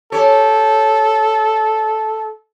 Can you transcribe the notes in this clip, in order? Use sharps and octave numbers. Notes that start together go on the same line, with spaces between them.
G4 A4 C#5